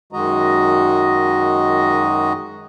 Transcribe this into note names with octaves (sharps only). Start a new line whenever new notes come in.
F#2 D#3 G#3 F#4 D#5 A#5